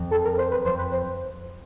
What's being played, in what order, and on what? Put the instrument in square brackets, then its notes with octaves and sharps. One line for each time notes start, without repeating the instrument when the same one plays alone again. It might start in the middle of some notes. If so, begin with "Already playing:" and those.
Already playing: [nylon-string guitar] F2
[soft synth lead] A4
A#4
C5
B4
[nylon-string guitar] F2 [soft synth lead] C5
[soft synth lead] B4
C5